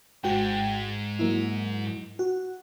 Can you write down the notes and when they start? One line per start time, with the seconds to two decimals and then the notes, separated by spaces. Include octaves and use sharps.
0.24 G#1 G#2 F#4 G5
1.19 F#3 A#3 E4
2.19 F#4